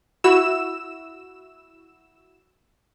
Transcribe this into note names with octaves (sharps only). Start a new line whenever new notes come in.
E4 F#4 E6 E7